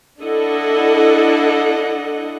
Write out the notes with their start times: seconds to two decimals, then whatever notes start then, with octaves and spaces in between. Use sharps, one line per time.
0.21 D4 E4 A4 D#5 F#5